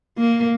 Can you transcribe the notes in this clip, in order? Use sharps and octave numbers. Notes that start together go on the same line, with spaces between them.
A#3